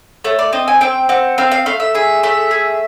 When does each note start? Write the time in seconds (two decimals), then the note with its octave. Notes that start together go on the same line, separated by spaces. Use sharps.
0.25 A3 C#5
0.39 D5
0.53 C4 D#5
0.68 G#5
0.81 C4 G5
1.09 C4 F#5
1.38 C4 F5
1.52 F5
1.66 A3 F5
1.80 E5
1.95 G#4 E5
2.23 A3 E5
2.51 G#4